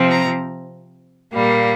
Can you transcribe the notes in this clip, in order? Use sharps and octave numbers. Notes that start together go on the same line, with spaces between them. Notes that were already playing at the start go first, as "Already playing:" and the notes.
Already playing: C3 F3 C4
A#5
A#2 G3 A#3